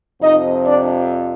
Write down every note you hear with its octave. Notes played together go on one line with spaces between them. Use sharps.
F2 C3 F3 D#4 D#5
D4 D5